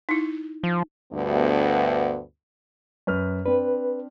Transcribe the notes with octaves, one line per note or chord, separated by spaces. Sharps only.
D#4 E4
F3
D2 G2 B3
F#2 B4 F6
C4 D4 B4